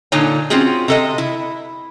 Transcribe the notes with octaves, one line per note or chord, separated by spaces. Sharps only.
A#2 D3 D4 D#4 C#5 G#5
C4 C#4 F4 F#4 G#4
C3 A4 D#5
E4